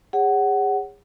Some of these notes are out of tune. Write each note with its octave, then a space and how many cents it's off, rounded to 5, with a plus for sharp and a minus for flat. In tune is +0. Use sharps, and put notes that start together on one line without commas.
G#4 -40 C#5 +0 F#5 +15